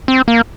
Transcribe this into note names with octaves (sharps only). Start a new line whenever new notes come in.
C4
A#3